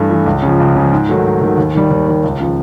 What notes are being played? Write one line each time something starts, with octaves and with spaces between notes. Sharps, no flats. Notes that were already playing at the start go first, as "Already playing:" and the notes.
Already playing: G2 E3 A3
E3 A3
C#2
C#3 F3
C#2
C#3 F3
G#2
D#3 F#3 A3
G#2
D#3 F#3 A3
D#2
D#3 G3
D#2
D#3 G3
C#2
C#3 F3